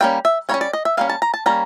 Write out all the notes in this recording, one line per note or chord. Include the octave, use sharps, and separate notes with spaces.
G3 A#3 C#4 G5
E5
G3 A#3 C#5
C#4
D5
D#5
E5
G3 A#3 C#4 F5
A5
A#5
A5
G3 A#3 C#4 A#5